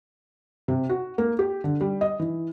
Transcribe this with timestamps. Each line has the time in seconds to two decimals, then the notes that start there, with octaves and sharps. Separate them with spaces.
0.68 C3
0.89 F#4
1.18 A#3
1.39 G4
1.64 D3
1.81 G3
2.01 D#5
2.20 E3